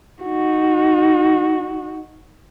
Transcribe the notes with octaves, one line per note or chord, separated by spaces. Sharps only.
D#4 F#4